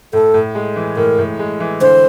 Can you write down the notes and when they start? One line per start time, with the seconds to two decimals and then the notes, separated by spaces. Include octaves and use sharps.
0.13 A2 A4
0.34 A2
0.55 G#3
0.76 E3
0.97 A2 A#4
1.19 A2
1.39 G#3
1.60 E3
1.81 D3 C5